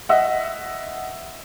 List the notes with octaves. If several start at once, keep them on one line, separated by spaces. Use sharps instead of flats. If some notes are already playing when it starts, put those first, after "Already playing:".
D#5 E5 F#5